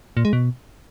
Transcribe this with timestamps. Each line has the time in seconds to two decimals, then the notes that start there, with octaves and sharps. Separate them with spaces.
0.17 A#2
0.25 G#3
0.33 B2